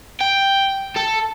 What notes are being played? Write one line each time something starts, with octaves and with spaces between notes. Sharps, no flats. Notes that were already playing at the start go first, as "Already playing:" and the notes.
G5
A4